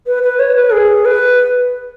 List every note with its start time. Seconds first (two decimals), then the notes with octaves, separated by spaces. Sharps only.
0.07 B4
0.23 B4
0.39 C#5
0.56 B4
0.73 G#4
1.05 B4